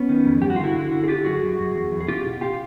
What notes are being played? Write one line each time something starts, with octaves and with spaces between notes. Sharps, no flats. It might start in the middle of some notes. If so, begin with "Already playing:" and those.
Already playing: B3 C#4
D#3
F2
G2 G4
F#4
D3 F4
E4 F#4
D3
D3
G#4
D3 F4 G4
F#2 F#4 G#4
F#2
F#2
E2
E2
G#4
B2 F4 G4
B2
F4 G4